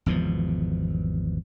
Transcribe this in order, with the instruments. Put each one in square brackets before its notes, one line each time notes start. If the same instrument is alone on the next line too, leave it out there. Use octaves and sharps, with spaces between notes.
[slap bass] G#1 E2 B2 F3